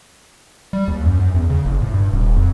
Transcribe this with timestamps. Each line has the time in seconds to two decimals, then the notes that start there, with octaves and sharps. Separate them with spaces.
0.73 G3
0.88 D#2
1.05 F#2
1.19 F#2
1.35 E2
1.50 C#3
1.65 F#1
1.82 A2
1.94 G2
2.12 D#1
2.36 F2